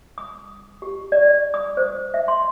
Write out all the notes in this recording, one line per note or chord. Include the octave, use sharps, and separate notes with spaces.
D#6
G4
D5
D#6
C5
E5
C6